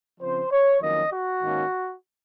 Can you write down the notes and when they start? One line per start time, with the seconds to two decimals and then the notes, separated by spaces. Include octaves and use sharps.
0.20 C#3 F3 C4 C5
0.51 C#5
0.81 F2 D#3 F#3 A#3 C#4 D#5
1.11 F#4
1.42 G#2 D#3 A#3 C#4